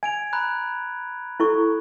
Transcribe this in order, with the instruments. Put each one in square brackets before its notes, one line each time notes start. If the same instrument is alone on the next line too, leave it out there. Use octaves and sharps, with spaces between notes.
[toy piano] G#5 [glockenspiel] G#6 D7 F7
[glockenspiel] A#5 B5 F#6
[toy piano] E4 A4 C#6